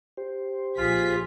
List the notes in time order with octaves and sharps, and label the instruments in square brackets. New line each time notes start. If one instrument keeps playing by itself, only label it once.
[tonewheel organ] G4 C5
[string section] A#1 G#4 B6 [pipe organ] F4